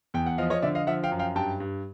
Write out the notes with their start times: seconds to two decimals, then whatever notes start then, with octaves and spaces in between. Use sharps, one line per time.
0.14 E2 G5
0.26 F#5
0.38 F3 D#5 F5
0.50 C#5 D#5
0.62 D3 D5 E5
0.75 D#5 F5
0.87 F3 E5 F#5
1.04 F5 G5
1.12 F#2
1.19 F5 G5
1.35 G2 G5 A5
1.60 G2